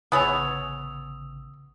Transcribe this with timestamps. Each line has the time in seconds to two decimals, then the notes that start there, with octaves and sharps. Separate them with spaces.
0.12 A1 C#3 B3 G#4 C#5 D#6 E6 F7